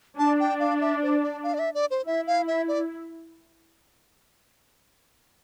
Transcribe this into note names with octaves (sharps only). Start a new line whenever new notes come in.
D4 A5
G5
F5
E5
C5
D5
F5
D5
E5
D5
C5
E4 E5
F5
E5
D5